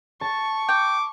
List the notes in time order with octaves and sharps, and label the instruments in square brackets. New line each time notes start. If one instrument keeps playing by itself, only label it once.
[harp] A5 [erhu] C#6
[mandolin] G5 [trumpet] D6